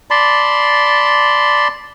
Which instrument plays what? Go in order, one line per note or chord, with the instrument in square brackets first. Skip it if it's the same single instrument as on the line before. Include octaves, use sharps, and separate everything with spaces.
[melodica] D5 A5 B5 C6